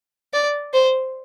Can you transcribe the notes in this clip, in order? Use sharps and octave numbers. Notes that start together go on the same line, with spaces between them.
D5
C5